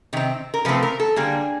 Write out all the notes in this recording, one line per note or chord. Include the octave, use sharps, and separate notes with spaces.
C3 D#3 C4
A#4
C3 F3 A3 C4 B4
A#4
A4
D3 G3 A#3 G#4